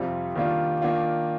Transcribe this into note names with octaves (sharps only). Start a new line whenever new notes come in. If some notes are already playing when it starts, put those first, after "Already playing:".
Already playing: F2 C3 G3 C4 F4
D#3 G3 A#3 D4 F4
D#3 A#3 D4 F4